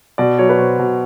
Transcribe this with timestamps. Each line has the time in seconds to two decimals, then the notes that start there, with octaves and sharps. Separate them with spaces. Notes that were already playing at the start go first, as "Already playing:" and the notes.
0.18 B2 D5
0.39 F#3 C#5
0.49 B4
0.59 B2 C5
0.79 B2